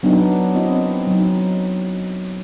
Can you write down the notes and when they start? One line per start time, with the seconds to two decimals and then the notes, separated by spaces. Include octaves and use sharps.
0.03 F#3 B3 D4 D#4
0.55 C4 E4 F#4 D#5
1.07 F#3 D#4